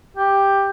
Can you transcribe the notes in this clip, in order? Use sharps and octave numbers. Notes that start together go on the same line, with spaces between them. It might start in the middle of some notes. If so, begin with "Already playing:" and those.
G4